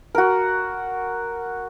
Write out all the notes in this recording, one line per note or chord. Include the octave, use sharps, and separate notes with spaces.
F#4 A#4